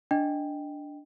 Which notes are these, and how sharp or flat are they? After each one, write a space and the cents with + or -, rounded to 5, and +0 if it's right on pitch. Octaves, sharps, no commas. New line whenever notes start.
D4 +0 D#5 +0 G5 +0